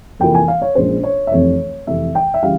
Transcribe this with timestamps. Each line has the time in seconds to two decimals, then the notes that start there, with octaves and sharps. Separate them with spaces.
0.19 F2 C3 E3 A#3 F4 G5
0.35 G#5
0.48 F5
0.62 C#5
0.75 A#1 A#2 G#3 C#4 C5
1.04 C#5
1.27 E5
1.31 F1 F2 C3 E3 C#5
1.87 F1 F2 C3 E3 E5
2.15 G5
2.34 E5
2.43 C#3 E3 G3 F5